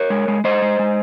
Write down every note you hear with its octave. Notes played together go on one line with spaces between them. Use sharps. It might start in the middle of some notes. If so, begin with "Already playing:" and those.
Already playing: A#4 C#5
G#3
G#3
G#3 C5 D#5
G#3
G#3